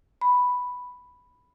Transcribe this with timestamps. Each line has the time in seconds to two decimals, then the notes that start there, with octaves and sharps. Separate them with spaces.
0.21 B5